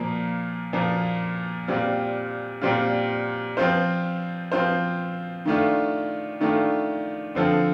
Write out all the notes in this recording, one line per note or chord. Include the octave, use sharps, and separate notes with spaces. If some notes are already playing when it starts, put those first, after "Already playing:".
Already playing: A#2 F3 A#3
A#2 F3 A#3
A#2 G3 C4 F4
A#2 G3 C4 F4
F3 C4 F4 C5
F3 C4 F4 C5
D#3 A3 D4 F4
D#3 A3 D4 F4
D3 F3 C4 F4 A4